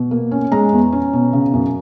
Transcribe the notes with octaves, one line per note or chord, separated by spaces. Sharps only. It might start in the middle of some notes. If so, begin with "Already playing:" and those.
Already playing: B2
A#3
C#4
G#3 A#5
E2
C#4
B2
C#3
F#2